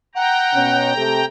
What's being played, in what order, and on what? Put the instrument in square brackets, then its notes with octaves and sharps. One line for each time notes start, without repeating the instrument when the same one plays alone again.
[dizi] F#5 [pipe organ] G5 A#5
[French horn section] B2 C#4
C3 A3